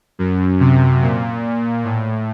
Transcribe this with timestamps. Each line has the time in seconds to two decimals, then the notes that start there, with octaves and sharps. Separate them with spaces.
0.19 F#2
0.60 C3
1.02 A#2
1.84 A2